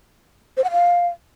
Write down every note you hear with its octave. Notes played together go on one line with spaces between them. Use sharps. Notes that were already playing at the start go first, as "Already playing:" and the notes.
C5
F#5
F5